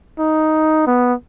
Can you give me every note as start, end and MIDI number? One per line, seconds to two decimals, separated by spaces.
0.19 0.85 63
0.87 1.14 59